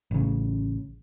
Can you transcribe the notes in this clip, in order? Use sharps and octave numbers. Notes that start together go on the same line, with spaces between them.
A1 C#3